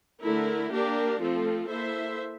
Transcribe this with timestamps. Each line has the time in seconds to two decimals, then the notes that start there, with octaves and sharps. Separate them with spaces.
0.23 D3 A3 E4 A#4
0.71 A#3 D4 G4 A#4
1.20 F3 A3 C4 F4 A4
1.69 A#3 E4 A4 C5 E5